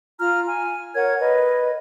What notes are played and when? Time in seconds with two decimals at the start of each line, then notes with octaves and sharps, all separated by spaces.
0.19 F4 A#5 F6
0.48 G#5
0.95 A#4 C#5 F#5 G#6
1.20 B4 D#5